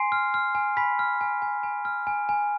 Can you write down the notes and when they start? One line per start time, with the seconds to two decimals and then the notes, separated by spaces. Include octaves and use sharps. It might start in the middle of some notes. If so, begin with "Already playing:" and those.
Already playing: G#5 C6 C7
0.12 F6
0.34 F6
0.55 G#5
0.77 G#5 B5 B6
0.99 F6
1.21 G#5
1.42 G#5
1.63 G#5
1.85 F6
2.07 G#5
2.29 G#5